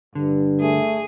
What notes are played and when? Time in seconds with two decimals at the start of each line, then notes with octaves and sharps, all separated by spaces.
0.15 G2 D3
0.61 A3 G#4